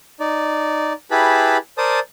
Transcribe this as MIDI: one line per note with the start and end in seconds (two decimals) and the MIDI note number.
0.20 0.93 63
0.20 0.93 74
1.11 1.57 64
1.11 1.57 67
1.11 1.57 68
1.11 1.57 71
1.11 1.57 81
1.11 1.57 83
1.78 2.00 70
1.78 2.00 72
1.78 2.00 74
1.78 2.00 81
1.78 2.00 87